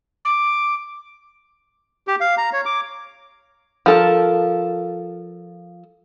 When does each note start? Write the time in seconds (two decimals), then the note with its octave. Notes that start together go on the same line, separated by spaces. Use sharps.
0.25 D6
2.08 G4
2.21 F5
2.38 A#5
2.53 C#5
2.66 D6
3.86 F3 A4 A#4